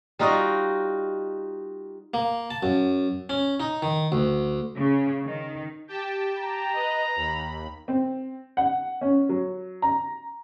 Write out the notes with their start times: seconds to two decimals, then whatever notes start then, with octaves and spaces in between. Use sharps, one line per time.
0.19 G3 D#4 F4 F#4 D#5
2.14 A#3
2.51 A5
2.63 F#2
3.30 C#4
3.60 D#4
3.82 D#3
4.12 D2
4.78 C#3
5.25 D#3
5.88 G4 G5 A5
6.39 A#5
6.72 B4 D#5
7.16 D#2 B5
7.88 C4
8.57 F#5
9.01 C#4
9.29 F#3
9.82 A#5